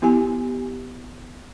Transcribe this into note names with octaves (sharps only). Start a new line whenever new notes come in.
B3 E4 G4 G#5